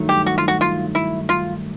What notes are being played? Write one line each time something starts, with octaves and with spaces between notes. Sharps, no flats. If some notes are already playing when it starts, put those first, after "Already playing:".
Already playing: G2 D#3 F#3 A3
G4
F#4
F4
F#4
F4
E4
F4